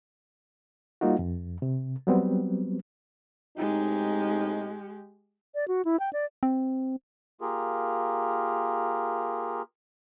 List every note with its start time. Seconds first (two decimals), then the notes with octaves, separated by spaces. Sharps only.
1.01 G3 A#3 D#4 F4 F#4
1.19 F2
1.62 C3
2.07 F#3 G3 B3 C4
3.58 A2 G#3 C4 D#4 G4
5.55 D5
5.68 F#4
5.85 E4
6.00 G5
6.13 D5
6.43 C4
7.41 A#3 F4 G4 G#4 A#4